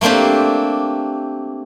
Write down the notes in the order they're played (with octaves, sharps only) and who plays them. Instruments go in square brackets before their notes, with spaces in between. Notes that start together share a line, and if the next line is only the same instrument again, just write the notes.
[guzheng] A3 A#3 C4 D4 G4